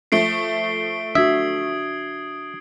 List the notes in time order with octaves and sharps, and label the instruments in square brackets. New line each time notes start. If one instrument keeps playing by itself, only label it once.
[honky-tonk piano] F3 A3 [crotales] C7 D7 G7
[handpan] D4 F#4 [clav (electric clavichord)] E5 [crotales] D#6 G#6